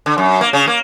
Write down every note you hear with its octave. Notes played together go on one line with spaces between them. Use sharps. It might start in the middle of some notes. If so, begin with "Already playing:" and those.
D3
F#2
A#3
C#3
A#3